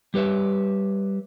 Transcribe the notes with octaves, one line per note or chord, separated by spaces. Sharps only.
G3 G4 B4 C#5 E5